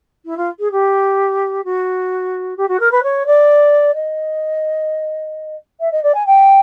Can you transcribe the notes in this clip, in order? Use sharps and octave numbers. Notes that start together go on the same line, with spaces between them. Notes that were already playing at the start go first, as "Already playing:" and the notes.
E4
F4
G#4
G4
F#4
G4
F#4
A#4
B4
C#5
D5
D#5
E5
D#5
D5
G#5
G5